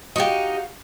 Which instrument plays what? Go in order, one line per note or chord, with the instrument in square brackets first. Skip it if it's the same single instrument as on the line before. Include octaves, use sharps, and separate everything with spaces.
[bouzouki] D#4 G4 [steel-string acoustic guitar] F#4 F5